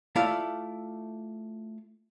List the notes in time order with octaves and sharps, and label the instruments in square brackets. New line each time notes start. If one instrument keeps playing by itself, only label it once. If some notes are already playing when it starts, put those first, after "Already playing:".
[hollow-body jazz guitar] A3 E4 F4 D5 F5